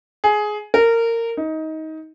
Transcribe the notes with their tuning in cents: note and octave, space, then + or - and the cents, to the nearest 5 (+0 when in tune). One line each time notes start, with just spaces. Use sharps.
G#4 +15
A#4 -20
D#4 +20